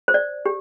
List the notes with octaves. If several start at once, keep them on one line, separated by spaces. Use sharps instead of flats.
C5
D5
G4